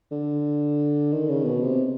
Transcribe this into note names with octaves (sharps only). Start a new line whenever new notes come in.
D3
D#3
C#3
B2
C3